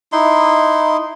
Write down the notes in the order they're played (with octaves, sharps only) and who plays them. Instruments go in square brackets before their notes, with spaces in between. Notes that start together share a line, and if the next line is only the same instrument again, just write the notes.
[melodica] D#4 E4 C6